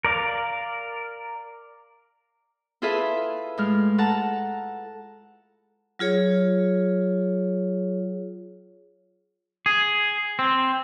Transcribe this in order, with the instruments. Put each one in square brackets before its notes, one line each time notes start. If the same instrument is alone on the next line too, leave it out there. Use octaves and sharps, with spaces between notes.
[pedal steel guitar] A#4 D5 F5
[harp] E4 F4 G#4 A4 B4 E5
A2 G#3 F6
A4 F#5 A5 A#5
[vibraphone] F#3 F4 G#4 C#5
[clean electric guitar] G#4
C4